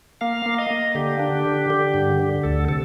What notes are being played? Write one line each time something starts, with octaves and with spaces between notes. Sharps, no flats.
A#3 F5
A#3
D#5
A#3
D3 G4
D4
D3
D3
G2
D3
D2 A4
C3 A4